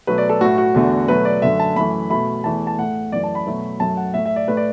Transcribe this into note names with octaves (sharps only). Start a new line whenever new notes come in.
B2 F#3 A3 B4
D5
A4
A2 A3 F#4
F#4
E2 D3 A3
B2 F#3 A3 B4
D5
F#2 D3 A3 E5
A5
F#2 E3 A3 B5
B2 A3 B5
E2 E3 A3 A5
A5
A2 A3 F#5
F#2 E3 A3 D5
A5
B5
B2 F#3 A3
F#2 F#3 A3 A5
F#5
A2 A3 E5
E5
D5
A2 A3 B4
D5